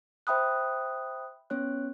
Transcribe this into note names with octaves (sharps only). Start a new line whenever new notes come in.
C5 E5 G5 B5 D#6 F#6
B3 C#4 C#5 F#6